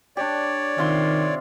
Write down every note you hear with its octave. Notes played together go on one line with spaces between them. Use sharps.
D4 G4 C#5 D5
C3 D#3 F4 C6